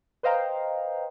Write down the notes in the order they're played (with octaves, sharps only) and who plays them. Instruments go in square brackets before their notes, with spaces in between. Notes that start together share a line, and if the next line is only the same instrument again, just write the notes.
[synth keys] B4 C5 D#5 F5 G5 A#5